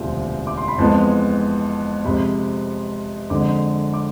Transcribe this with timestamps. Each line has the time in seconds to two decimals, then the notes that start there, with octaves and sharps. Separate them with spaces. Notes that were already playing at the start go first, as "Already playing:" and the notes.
Already playing: E1 D2 C3 F3
0.47 D6
0.57 C6
0.68 B5
0.78 F2 E3 G#3 B3 A5
2.05 F2 C3 G#3 B5
3.30 F2 D3 G#3 D6
3.94 D6